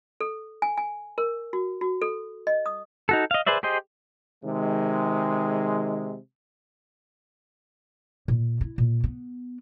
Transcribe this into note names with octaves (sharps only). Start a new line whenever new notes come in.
A4
G#5
G#5
A#4
F#4
F#4
A4
D#5
D#6
D#4 F#4 A4
D#5 F5
G#4 B4 C5 D5 E5
G4 G#4 C5 D#5
C3 D#3 G#3
A#2
E4
A#2
B3